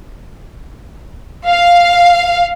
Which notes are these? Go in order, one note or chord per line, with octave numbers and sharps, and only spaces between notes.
F5